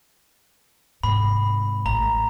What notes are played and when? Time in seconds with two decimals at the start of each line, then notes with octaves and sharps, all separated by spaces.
1.03 G#2 C3 B5
1.86 A1 A#5